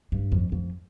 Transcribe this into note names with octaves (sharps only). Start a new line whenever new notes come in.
G2
F2
F2